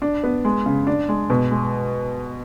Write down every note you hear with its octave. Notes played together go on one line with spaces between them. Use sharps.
D4
B3
G#3
C#3
D4
G#3
B2
G#3